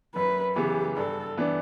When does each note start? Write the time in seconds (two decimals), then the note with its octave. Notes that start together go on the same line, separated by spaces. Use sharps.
0.15 F#2 B4
0.56 C#3 E3 B3 G4
0.97 G2 A4
1.37 E3 B3 D4